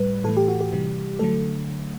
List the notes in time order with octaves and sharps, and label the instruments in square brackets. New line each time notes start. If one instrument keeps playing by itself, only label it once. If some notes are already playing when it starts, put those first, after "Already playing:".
Already playing: [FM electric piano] A2 G3 B4
A2 E3 A3 A4
G4
F#4
G4
C3 E3 G3
D3 F#3 A3 A4